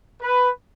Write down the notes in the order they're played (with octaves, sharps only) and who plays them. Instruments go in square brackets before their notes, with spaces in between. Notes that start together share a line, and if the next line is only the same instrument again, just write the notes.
[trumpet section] B4